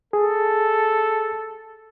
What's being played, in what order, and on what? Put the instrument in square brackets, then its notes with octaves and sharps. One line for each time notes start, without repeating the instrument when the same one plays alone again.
[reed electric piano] G#4 [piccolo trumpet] A4